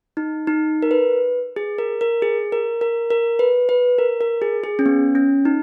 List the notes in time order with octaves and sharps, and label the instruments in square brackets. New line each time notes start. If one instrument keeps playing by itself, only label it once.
[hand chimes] D#4
D#4
A#4
B4
G#4
A#4
A#4
G#4
A#4
A#4
A#4
B4
B4
A#4
A#4
G#4
G#4
C#4
B3
C#4
D#4